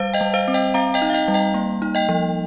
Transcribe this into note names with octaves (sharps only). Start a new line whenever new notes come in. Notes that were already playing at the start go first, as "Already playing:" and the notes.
Already playing: G3 C5 F5
D#5 G5
G3
C5 F5
C4
D#5 G5
C4 F5 A#5
D#5 G5
D#4
F5
D#5 G5
G3
D#5 G5
A#3
D#4
D#5 G5
F3